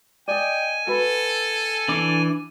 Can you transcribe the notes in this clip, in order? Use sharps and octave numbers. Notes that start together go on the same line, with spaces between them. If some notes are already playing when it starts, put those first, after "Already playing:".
D5 D#5 G5 G#5
F#4 A4 B4
E3 D4 D6